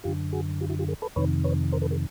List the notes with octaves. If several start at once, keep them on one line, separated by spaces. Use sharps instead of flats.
F#2 D3 F4 G4
F#4 G#4
F4 G4
E4 F#4
F4 G4
G#4 A#4
A4 B4
F2 C3 D#3 B4 C#5
B4 C#5
A#4 C5
A4 B4
G#4 A#4